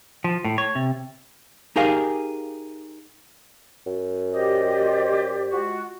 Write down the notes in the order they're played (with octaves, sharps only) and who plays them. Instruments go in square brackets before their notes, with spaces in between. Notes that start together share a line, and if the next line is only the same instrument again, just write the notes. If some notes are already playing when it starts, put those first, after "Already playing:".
[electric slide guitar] F3
A2
C#5
C3
[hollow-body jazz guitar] D#4 G4 G#4 A#4 F5
[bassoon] F#2
[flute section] G4 C5 D5 [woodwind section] D#5
[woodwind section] G#3 F4 F#4